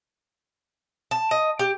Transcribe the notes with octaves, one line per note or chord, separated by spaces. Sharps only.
A5
D#5
G4